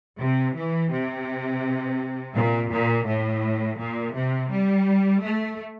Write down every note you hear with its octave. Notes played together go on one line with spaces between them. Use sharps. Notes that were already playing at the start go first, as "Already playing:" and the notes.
C3
E3
C3
A#2
A#2
A2
A#2
C3
G3
A3